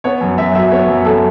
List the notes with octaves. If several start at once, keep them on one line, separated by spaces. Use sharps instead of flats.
B3 C#5
F#2
F#2 E5
F#3 E5
B3 C#5
F#2
F#2 A4